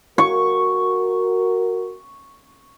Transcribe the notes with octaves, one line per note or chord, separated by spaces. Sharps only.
F#4 A#4 C#6